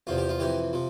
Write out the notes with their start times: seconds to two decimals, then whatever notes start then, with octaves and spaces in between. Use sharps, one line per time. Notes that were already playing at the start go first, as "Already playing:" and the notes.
0.07 E2 C3 F3 F4
0.18 G4
0.29 F4
0.39 F2 C3 E3 G4
0.73 C3 F3